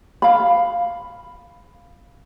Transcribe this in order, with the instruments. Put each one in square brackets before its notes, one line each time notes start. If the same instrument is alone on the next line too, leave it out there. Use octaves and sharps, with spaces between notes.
[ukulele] F5 B5